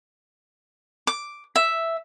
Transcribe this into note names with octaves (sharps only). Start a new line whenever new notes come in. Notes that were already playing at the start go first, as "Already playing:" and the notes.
D6
E5